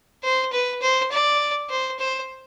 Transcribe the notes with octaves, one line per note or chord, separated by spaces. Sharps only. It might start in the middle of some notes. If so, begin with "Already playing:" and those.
C5
B4
C5
D5
C5
C5